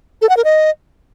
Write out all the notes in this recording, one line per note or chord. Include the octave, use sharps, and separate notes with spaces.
A4
F#5
A#4
D#5